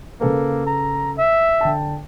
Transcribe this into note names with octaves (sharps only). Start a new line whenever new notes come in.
C#3 A#3 A4 B4
A#5
E5
D3 G5 A5